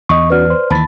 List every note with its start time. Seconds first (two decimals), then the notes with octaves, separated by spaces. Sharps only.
0.09 E2 D#5 C#6
0.30 C#4 F#4 B4 D5 F6
0.50 C5
0.70 D#2 E3 A5 B5 A6